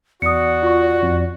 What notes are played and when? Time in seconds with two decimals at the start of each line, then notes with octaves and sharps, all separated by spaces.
0.22 E2 F#4 D5 D#6 C#7
0.63 F4 C#6
1.03 F2